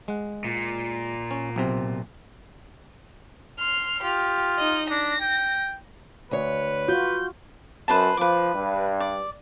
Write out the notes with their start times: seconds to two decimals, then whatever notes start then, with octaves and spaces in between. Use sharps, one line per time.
0.08 G#3 F#5
0.45 A#2
1.31 C#4
1.56 B1 C3 C4
3.59 C6 F6
4.03 F4 G4
4.58 D#4 D#5
4.90 D4 A#6
5.21 G5
6.31 D2 B4 C#5
6.88 F4 F#4 G6
7.88 F#2 B4 C5 A5
8.17 F3 B4 D6
8.54 G2
9.00 D5